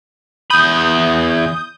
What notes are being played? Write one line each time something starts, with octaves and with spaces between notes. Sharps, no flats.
E2 B5 D#6 G6